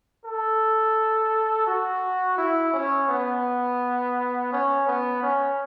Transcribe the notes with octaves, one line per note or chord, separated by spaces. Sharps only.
A4
F#4
E4
C#4
B3
C#4
B3
C#4